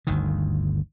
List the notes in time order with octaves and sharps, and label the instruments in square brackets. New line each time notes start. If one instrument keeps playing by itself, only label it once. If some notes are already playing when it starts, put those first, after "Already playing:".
[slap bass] G1 D2 D#3